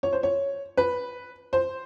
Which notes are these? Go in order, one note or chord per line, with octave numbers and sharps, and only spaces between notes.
C#5
C5
C#5
B4
C5